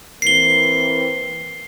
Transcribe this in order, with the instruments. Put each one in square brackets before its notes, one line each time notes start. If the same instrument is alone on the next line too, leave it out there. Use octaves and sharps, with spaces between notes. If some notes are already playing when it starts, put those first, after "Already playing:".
[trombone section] E3 A#3 C4 [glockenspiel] C7 G7